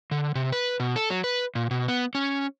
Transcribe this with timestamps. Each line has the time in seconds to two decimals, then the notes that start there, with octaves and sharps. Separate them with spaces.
0.11 D3
0.35 C3
0.52 B4
0.80 B2
0.96 A4
1.10 F#3
1.24 B4
1.55 A#2
1.71 B2
1.88 B3
2.15 C#4